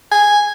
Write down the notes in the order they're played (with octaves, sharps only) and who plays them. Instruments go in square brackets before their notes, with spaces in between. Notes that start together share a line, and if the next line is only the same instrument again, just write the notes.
[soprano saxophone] G#5